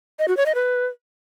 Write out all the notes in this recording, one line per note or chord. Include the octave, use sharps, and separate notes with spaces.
D#5
F#4
C#5
D#5
B4